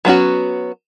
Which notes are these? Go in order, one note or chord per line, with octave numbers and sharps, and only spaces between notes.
F#3 B3 C#4 F#4